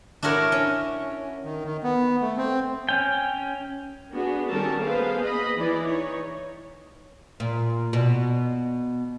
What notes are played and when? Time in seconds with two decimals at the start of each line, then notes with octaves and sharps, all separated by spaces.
0.23 D4 E4 F#4 A#4 C#5
0.52 C#4
1.45 D#3
1.65 D#3
1.83 B3
2.21 A3
2.37 C4
2.89 C#4 G5
4.11 B3 D4 F#4 G#4
4.50 D#3 G3 C#4 A4 A#4 A5
4.82 A#3 B3 G#4 B4 C5 F5
5.24 D#5 B5
5.57 E3 D5
5.86 D#4 C#5
7.40 A#2
7.93 B2